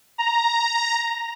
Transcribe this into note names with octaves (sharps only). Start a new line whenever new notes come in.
A#5